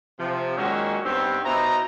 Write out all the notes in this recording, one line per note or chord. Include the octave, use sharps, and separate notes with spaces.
C3 F3
A#2 D#3 F#3 G#3 C#4 F#4
G2 B3 C4 D#4 G4
B2 D#4 E4 C5 A#5